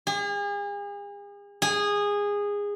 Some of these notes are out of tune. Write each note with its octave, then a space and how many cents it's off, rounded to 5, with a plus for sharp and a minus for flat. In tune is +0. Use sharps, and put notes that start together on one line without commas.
G#4 -40
G#4 -20